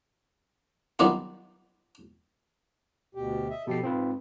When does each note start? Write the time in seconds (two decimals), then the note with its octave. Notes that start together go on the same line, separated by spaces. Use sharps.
0.99 D#3 F#3 G3 B3 F4 G4
3.15 D2 B2 G4
3.50 D#5 E5
3.67 B2 F3 G4 A4 C7
3.83 G#2 C4 F4 B4